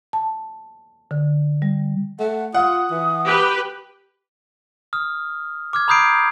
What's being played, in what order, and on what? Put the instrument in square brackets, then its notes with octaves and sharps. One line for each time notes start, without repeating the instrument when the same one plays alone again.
[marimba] A5
D3
G3
[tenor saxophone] A3 [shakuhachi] F#5
[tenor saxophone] F4 [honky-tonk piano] F#5 [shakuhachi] D#6
[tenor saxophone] E3
[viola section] G4 B4
[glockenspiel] D#6 F6
D6 F6 G#6
A#5 B5 D#6 G6 C7 D7